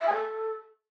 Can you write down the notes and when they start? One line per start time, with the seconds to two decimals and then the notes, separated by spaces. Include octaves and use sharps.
0.01 E5
0.07 G#5
0.13 A4